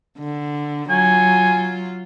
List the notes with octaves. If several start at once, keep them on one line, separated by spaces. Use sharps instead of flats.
D3
F#3 F4 G#5